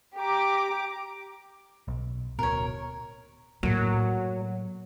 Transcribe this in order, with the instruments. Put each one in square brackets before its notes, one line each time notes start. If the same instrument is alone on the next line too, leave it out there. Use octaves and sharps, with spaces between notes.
[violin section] G4 A#5 D6
[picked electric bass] B1
[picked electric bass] D1 B2 [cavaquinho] A#4 C#5
[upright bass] A2 A#3 [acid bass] F#3